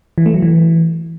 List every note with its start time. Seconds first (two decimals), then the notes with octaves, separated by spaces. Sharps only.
0.18 E3
0.26 A3
0.34 F#3
0.42 E3